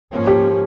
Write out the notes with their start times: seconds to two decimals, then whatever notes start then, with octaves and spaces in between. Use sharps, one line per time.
0.12 G#2 F3 A#3 C#4
0.27 G4